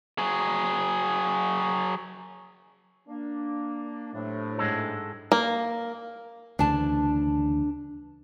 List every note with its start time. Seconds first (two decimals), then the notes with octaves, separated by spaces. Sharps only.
0.19 F#3 G#4
3.08 A#3 D4
4.13 A2 C3 F#3 D4
4.58 G#2 G#3 A4
5.32 A#3
6.59 D2 C#3 E3 D4 A5